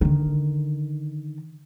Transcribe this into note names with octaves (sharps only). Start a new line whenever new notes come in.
D3 D#3